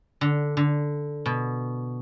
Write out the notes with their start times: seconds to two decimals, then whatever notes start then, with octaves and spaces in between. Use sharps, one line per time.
0.21 D3
0.57 D3
1.26 B2